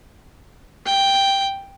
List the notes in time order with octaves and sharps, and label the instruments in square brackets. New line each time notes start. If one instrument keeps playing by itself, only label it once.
[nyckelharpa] G5